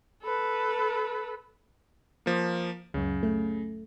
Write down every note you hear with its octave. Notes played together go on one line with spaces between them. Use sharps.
A4 B4
F3 A#3
C#2 F#2 C#3
A3